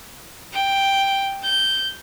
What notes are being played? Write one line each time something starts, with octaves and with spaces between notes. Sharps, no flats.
G5
G6